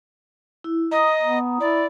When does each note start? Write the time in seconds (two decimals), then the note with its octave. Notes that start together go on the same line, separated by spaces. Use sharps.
0.64 E4
0.91 D#5 A#5 D#6
1.22 B3
1.60 E4 D5